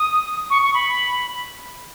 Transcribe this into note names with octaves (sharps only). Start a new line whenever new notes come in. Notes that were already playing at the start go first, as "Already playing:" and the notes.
Already playing: D#6
C#6
C#6
B5